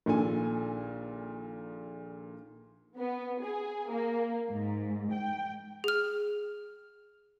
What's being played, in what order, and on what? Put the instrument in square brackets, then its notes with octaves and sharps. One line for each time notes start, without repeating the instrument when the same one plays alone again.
[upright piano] A#1 A#2 D#3 A4 G#5
[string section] B3
G#4
A#3
G#2
G5
[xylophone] G#4 F6